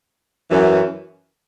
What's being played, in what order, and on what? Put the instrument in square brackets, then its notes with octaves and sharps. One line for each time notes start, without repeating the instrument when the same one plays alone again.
[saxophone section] F#2 E3